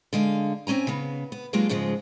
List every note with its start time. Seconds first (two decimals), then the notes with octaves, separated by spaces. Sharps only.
0.13 D3 G#3 F5
0.67 C4 C#4 G#5 A#5
0.87 C#3 B3
1.32 B3
1.53 F#3 G#3 A#3 D4 F4 G4
1.69 G#2 C#3 F3 G#3